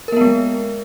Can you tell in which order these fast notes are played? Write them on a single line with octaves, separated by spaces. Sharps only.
A#4 A#3 B3 G#3